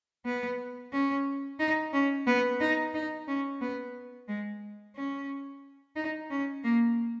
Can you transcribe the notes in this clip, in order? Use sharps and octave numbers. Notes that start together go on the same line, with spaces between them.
B3
C#4
D#4
C#4
B3
D#4
D#4
C#4
B3
G#3
C#4
D#4
C#4
A#3